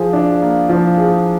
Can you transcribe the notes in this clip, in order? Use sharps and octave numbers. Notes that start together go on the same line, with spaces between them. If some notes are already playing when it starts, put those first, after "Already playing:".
Already playing: F3 G#4
D4
A#3
F3
G#4